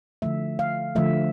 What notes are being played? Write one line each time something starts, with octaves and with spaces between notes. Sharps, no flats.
D3 F3 A3 E5
F5
D3 F3 A3 E5